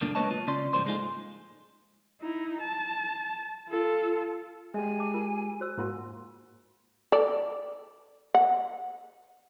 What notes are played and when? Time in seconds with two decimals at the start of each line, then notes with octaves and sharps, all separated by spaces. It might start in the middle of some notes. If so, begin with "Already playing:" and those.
0.01 C#2 F#2 A#2 D3 A#3 D4
0.15 G#3 A#3 B4 C#5 D#5 A5
0.31 F4
0.47 C#3 C#4 D5 C6
0.73 G#2 F3 G3 A#3 C5 C6
0.86 G#3 A3 D#4 F4 G#4
2.21 D#4 E4
2.60 A5
3.68 F4 A4
4.74 G#3 G4 E5 G#5
4.99 A5 D6
5.14 F4 A#4
5.60 F#4 C5 E6
5.78 G#2 A#3 F4 F#4 C6
7.12 A4 D5
8.34 F#5